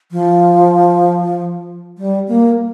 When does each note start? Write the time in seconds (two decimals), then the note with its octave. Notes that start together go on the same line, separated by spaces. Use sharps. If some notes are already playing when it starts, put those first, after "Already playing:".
0.12 F3
1.98 G3
2.28 A#3